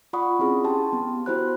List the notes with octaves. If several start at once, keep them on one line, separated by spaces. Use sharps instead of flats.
F4 D5 F#5 B5 C#6 D#6
C4 C#4 E4 G#4
G4 G5 A5 C6
B3
E4 F#4 G4 C5 B5 F#6